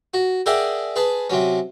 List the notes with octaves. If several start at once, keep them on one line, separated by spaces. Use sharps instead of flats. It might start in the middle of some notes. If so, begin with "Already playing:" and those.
F#4
G#4 A#4 D5 E5 F#5 G5
G#4 B4 A5
C3 F#3 C#4